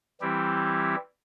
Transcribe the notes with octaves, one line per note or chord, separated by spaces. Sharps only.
E3 G3 C4 E4 G4